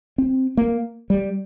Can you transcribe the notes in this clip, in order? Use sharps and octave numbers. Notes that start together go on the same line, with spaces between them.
C4
A#3
G3